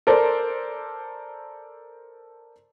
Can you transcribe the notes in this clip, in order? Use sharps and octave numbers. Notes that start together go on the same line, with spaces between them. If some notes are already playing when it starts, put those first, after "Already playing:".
A4 A#4 C5 D5